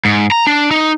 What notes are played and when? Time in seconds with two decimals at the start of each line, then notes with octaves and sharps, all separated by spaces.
0.05 G#2
0.31 A#5
0.47 D4
0.71 D#4